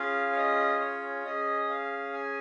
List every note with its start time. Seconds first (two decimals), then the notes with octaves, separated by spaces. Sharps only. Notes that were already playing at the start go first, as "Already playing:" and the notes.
Already playing: C#4 F4 G#4 F5
0.32 C#5
0.36 D#5
0.80 C#5
1.25 C#4 G#4 D#5
1.69 F5
2.13 G#5